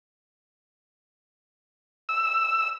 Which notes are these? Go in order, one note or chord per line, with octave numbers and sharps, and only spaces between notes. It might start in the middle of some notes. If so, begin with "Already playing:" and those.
E6